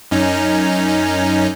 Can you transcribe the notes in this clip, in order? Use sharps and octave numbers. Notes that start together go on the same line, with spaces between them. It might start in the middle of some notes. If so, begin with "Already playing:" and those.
F#2 C#4 D#4